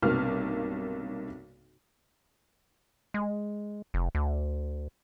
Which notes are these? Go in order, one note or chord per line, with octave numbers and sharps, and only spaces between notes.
B1 G2 C3 A#3 F6
G#3
F1
D2